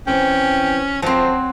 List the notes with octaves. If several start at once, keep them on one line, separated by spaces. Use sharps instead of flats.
E3 C4 C#4 G5
D2 F3 F#3 C4 C5 A5